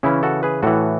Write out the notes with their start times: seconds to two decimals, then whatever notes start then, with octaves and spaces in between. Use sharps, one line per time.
0.03 C#3 E3 C#4 E4
0.23 F#4 A4
0.43 G#4 B4
0.63 A2 E3 F#4 A4